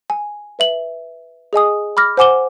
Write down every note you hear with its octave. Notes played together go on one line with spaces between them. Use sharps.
G#5
B4 E5 F#7
G#4 D#5 G#5 D#6
B5 D6 F6 A#6
C5 F#5 G#5 D6 E7 G7